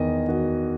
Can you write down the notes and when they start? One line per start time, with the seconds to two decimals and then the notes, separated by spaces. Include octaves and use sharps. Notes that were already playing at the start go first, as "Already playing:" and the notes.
Already playing: E2 D#3 D#5
0.28 D#3 F#4